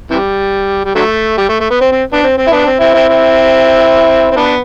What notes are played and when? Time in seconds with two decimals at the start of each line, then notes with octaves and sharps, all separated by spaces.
0.10 C3 E3 G3
0.85 G3
0.95 D3 F#3 A3
1.38 G3
1.49 A3
1.60 A3
1.70 B3
1.81 C4
1.92 C4
2.13 B3 D4
2.23 C4
2.38 C4
2.47 E4
2.51 B3 D4
2.66 C4
2.80 C4 E4
2.94 C4 E4
3.09 C4 E4
4.31 C4
4.36 B3 D4